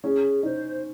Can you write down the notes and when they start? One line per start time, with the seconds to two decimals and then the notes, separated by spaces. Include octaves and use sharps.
0.04 C#4 G#4
0.43 D#4 C5